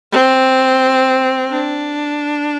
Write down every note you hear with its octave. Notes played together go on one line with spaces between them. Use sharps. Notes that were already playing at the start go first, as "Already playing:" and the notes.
C4
D4